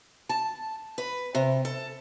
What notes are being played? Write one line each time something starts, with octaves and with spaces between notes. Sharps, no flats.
A5
B4
C3
A4